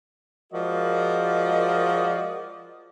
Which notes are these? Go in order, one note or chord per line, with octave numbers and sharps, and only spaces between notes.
F3 G#3 F#4 A#4 D5 D#5